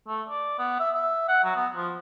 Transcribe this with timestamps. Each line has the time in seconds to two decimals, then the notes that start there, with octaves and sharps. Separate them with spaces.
0.08 A3
0.28 D5
0.59 B3
0.79 E5
0.94 E5
1.28 F#5
1.44 F#3
1.55 B3
1.76 F3